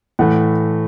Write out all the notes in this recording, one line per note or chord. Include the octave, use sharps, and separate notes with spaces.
A2 E3 A3 F#5